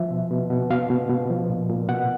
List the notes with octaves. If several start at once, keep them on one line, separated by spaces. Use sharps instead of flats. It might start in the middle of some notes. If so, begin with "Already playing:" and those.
Already playing: F3 E5
B2
B2
B2
B2 F5
B2
B2
F3
A#2
A#2
B2 F#5